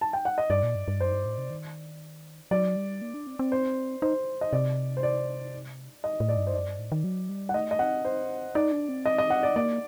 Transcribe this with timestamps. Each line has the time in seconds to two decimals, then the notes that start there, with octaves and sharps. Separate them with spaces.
0.01 A5
0.13 G5
0.25 F#5
0.38 D#5
0.50 G2 D5
0.63 A#2
0.75 G2
0.88 G2
1.00 F#2 C5
1.13 G2
1.26 A2
1.38 C3
1.50 D#3
2.51 F#3 D5
2.76 G3
3.02 A#3
3.14 D4
3.27 C4
3.39 C4
3.52 C5
4.02 D#4 C5
4.41 D#5
4.53 C3 D5
4.97 C5
5.03 D5
6.04 D#5
6.20 A2
6.29 D5
6.37 G2
6.47 C5
6.54 F#2 D5
6.67 G2
6.79 A2
6.92 D#3
7.04 F#3
7.29 G3
7.49 F#5
7.54 A3 D#5
7.71 D#5
7.79 C4 F#5
8.05 C5
8.55 D#4 D5
8.72 D4
8.89 C4
9.06 D#5
9.18 D#5
9.30 F#5
9.43 D5
9.56 A#3 D5